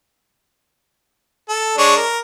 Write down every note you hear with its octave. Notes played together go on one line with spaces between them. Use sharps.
A4
G#3 D4 C#5
A#4